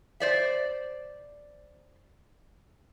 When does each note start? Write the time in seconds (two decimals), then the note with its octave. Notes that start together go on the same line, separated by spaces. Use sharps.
0.20 C5 D5 E5